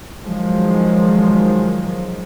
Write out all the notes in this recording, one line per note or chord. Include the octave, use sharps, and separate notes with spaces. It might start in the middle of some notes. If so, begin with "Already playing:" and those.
D#3 F3 F#3 G#3